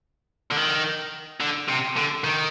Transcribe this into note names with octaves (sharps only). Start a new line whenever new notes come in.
D3
D#3
D3
C3
D3
D#3